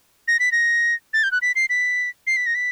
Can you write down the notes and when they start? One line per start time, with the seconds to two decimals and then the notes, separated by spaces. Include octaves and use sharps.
0.28 A#6
0.40 B6
0.52 A#6
1.14 A6
1.23 G6
1.32 F#6
1.42 B6
1.56 C7
1.70 B6
2.27 C7
2.37 B6
2.46 A#6
2.55 B6